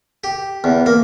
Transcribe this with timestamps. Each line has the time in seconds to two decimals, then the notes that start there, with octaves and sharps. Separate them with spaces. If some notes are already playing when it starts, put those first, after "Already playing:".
0.24 G4
0.64 E2
0.86 A#3